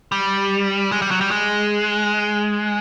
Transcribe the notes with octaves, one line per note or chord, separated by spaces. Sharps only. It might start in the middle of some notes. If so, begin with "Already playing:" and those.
G3
G#3
G3
F#3
G3
G#3